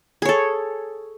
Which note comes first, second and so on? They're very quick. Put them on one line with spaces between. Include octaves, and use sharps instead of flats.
G#4 C#5 A4